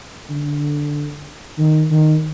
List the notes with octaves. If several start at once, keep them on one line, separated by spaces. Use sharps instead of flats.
D3
D#3
D#3